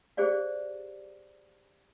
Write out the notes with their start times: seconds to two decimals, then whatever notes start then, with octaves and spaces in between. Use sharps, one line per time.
0.17 G4 G#4 C5 D5 F5